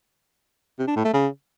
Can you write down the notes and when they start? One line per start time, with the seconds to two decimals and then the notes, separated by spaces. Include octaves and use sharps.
0.79 C3
0.87 D4
0.96 A2
1.05 A3
1.13 C#3